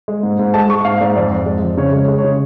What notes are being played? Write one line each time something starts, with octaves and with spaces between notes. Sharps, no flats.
G#3
G#2
G#2
G#3 A5
G#3 C#6
G#2 F5
G#2 D5
F2 D5
F2
G#3 D5
F2
C#3 C#5
G#3
C#5
G#3
C#5
C#3